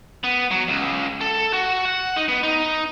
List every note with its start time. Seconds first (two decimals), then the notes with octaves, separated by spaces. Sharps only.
0.24 B3
0.51 F#3
0.68 C#2
1.21 A4
1.53 F#4
1.85 F#5
2.16 D#4
2.29 B3
2.43 D#4